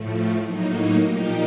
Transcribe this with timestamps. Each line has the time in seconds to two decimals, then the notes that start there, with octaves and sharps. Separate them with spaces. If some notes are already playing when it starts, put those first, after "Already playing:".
Already playing: A2 F3 A3
0.44 A2 F#3 A#3 D#4
1.05 A#2 F3 A#3 D#4 G4